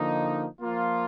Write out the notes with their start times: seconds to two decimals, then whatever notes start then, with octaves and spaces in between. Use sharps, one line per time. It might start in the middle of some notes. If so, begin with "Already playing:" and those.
Already playing: D3 F3 A#3 D#4
0.62 F3 A#3 F4